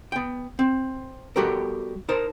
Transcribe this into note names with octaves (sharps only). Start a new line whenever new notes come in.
B3 G5
C4
G3 B3 F#4 G4 A4 A#4
D#4 A#4 C5 A5